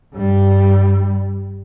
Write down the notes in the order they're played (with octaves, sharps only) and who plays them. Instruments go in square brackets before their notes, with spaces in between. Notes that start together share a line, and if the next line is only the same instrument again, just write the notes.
[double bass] G2 G3